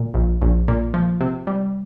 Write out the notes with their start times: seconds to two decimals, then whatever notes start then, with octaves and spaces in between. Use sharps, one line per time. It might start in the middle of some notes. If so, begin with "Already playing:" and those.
Already playing: A#2
0.14 A#1
0.42 A#1
0.68 A#2
0.94 F3
1.21 C3
1.47 G3